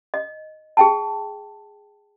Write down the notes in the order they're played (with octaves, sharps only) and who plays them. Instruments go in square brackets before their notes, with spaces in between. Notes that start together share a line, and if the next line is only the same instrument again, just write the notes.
[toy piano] D#5
G#4 G5 A5